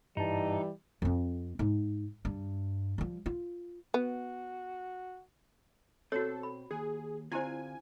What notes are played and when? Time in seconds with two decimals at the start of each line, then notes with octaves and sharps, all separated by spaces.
0.17 G2 E3 G3 D#4 A5
1.02 F2 C4
1.59 G#2
2.25 G2
2.98 F3 G3
3.26 F4
3.94 B3 F#4
6.12 B2 C4 F#4 A4 C#5
6.43 B5
6.71 D#2 G#4
7.32 D3 C4 E4 F4 G4 C5 G#5